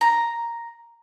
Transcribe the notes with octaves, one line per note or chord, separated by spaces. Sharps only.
A#5